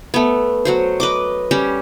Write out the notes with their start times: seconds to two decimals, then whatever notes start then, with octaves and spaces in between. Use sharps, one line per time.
0.14 A3 B3
0.65 F#3 F#4 C5
1.00 B4 D#5 D6
1.51 G3 C#4 G4